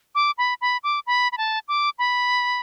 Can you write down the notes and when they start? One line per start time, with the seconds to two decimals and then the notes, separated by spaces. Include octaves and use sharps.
0.15 D6
0.38 B5
0.61 B5
0.83 D6
1.07 B5
1.32 B5
1.38 A5
1.68 D6
1.99 B5